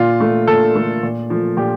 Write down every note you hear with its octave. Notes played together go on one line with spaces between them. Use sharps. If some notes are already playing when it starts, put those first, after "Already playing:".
Already playing: A#2 F4
A3
A#2 A4
A3
A#2
F3 A3
A#2 G4